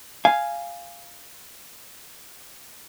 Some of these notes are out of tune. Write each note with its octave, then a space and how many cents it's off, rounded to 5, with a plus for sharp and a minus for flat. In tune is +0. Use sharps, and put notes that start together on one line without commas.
F5 -5 G#5 +0